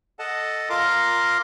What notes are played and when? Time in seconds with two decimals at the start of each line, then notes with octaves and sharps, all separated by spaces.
0.19 A4 D#5 F#5 A5
0.70 F4 A#4 A#5 C6 D6